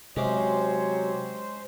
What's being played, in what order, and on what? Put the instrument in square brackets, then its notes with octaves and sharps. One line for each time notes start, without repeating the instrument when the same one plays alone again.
[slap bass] C3 [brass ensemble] F#3 G4 C#5 [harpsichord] G#3 C#4 D6 [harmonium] C5